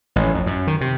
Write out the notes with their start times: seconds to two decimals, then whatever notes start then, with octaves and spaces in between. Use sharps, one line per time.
0.16 A1
0.34 F2
0.46 F#2
0.67 D#3
0.81 C3